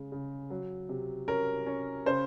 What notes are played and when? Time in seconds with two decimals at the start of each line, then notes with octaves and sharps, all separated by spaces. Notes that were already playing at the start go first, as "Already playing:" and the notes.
Already playing: C#3 G#3
0.12 C#3
0.50 F#3
0.89 C3
1.28 C#4 A#4
1.66 C#4
2.06 C#3 C5